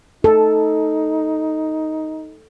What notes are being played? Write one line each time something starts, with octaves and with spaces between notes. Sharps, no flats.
D#4 A4